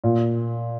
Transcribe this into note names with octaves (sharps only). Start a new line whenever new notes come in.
A#2